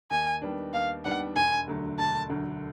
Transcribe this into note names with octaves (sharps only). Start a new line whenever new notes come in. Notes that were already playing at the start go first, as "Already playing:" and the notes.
D#2 G#5
D#3 G3 B3 D4
D#2 F5
D#3 G3 B3 D4 F#5
E1 G#5
D2 D3 F#3 A3
E1 A5
D2 D3 F#3 A3